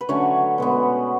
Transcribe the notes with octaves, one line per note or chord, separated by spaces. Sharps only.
B4
D3 F#3 A3 C#4 C#5
B2 G#3 B3